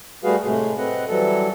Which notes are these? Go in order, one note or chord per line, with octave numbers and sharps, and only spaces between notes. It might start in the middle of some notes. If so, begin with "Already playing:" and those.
G3 A3 F#4 G#4 B4 F5
A2 C3 G#3 A3
C4 B4 D#5 F#5
E3 F#3 G3 A4